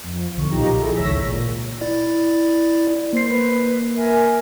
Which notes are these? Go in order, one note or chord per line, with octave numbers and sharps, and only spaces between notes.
F2
B1 D3 C#6
B1 A#2 F3 D#4 G4 A#5
E4 G#4 A4
G#1 C#2 C#5 E6 A#6 B6
A#2
E4 D5
A#3 C5 C7
B4
A#4 E5 G#5